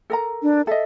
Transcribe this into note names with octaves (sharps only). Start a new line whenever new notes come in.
A4 A#4 A#5
D4
A4 D#5 E5